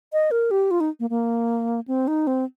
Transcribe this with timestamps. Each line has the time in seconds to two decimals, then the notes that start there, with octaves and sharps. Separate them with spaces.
0.13 D#5
0.31 A#4
0.51 G4
0.71 F4
0.80 D#4
1.00 A#3
1.10 A#3
1.88 C4
2.08 D#4
2.27 C4